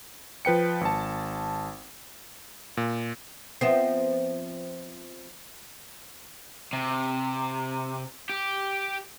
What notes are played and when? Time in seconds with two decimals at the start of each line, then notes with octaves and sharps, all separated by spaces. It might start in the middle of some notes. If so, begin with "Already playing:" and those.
0.45 F3 B4 G5 C#7
0.81 G#1 A5
2.77 A#2
3.61 F3 B3 C4 C5 E5
6.73 C3
8.29 G4